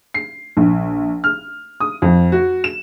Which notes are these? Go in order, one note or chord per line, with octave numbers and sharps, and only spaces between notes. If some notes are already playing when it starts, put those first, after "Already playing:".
C7
A#1
F6
D#6
F2
F#4
E7